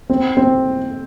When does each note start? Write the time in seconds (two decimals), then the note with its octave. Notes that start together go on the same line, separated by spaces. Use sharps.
0.10 C4
0.37 C4